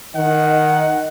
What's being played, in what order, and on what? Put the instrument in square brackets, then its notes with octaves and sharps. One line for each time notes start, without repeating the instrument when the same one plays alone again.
[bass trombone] D#3 [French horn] D#5 [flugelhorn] F#5